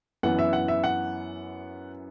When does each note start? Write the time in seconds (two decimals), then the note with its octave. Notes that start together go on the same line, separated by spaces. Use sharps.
0.23 F#2 E3 B3 F#5
0.39 E5
0.53 F#5
0.68 E5
0.84 F#5